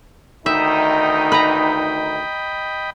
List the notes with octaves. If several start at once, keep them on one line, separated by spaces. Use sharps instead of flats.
D2 D#3 D#4 D#5 E5 G5 B5
B4 A#5